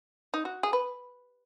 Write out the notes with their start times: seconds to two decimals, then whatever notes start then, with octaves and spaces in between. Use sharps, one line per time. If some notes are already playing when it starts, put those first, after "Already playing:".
0.34 D#4
0.45 F#4
0.63 G#4
0.73 B4